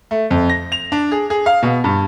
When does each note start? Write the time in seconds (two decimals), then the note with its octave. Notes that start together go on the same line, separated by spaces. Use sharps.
0.11 A3
0.31 F2
0.50 A#6
0.72 F7
0.92 D4
1.12 G#4
1.30 G#4
1.46 F5
1.63 B2
1.84 G2